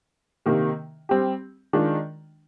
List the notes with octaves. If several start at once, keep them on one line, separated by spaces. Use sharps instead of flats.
C3 D#3 A#3
G3 C4 G4
D#3 G#3 D4 F4